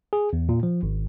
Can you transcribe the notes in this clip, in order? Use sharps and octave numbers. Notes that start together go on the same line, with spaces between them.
G#4
E2
A#2
F3
G#1